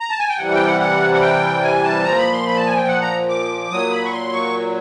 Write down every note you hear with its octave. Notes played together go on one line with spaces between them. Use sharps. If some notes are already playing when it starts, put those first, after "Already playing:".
A#5
A5
G#5
G5
C3 E3 G3 F#5
G5
F#5
F#5
F#5
G5
G#5
A5
A#2 F3 A#5
B5
C6
B5
A5
G#5
G5
F#5
A#5
D6
A#2 F#3 D#6
B5
C#6
C6
C#6